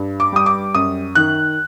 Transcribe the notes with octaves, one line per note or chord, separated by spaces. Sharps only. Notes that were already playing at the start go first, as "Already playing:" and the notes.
Already playing: G2
D6
G3 D#6
D6
F#2 D#6
D#3 F#6